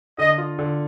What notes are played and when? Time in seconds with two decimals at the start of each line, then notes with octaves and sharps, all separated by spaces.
0.18 D3 D#5
0.38 F4
0.59 D3